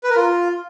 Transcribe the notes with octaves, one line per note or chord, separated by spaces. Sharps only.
B4
A#4
F4